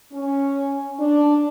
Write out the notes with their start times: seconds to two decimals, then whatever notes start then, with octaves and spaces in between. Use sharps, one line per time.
0.12 C#4
0.99 D4